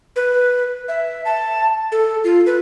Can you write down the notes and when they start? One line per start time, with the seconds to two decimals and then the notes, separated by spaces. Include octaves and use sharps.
0.16 B4
0.88 E5
1.25 A5
1.92 A4
2.24 F4
2.46 B4